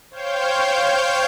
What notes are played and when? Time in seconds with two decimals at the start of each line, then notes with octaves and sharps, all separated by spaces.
0.11 C5 C#5 F5 G5 G6